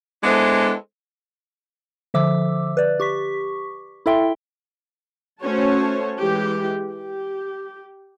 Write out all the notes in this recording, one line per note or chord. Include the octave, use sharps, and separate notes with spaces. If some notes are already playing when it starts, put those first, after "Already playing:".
G#3 B3 D4 E4 A4 C5
D3 F3 E5 D6 E6
B4 D5
G4 C#6 B6
E4 A4 E5 G5 C6
A3 C#4 F#4 C5 C#5 A5
E3 G#3 G4
G4